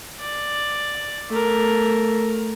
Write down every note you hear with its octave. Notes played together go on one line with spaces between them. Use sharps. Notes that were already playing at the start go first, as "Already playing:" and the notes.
D5
A3 A#4